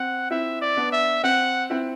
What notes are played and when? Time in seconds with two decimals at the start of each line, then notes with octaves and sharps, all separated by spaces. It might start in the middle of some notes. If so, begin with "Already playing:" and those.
Already playing: C4 F#5
0.30 C4 E4 E5
0.61 D5
0.77 B3 D4
0.92 E5
1.23 C4 F#5
1.70 C4 E4